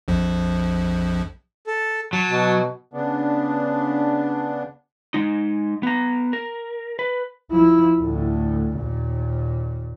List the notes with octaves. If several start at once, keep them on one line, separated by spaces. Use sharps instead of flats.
A#1 F2 F3
A4
F#3 A5
B2
C#3 B3 D4
G#3 D#4
B3 A#5
A#4
B4
F3 E4
D2 A2
D#2 A#2